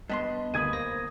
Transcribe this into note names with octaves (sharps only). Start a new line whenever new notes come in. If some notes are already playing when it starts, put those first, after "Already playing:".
G2 B3 D#5 A5 C6
D2 A#3 B5 D#6 G#6 D#7
A#3 C5 A#6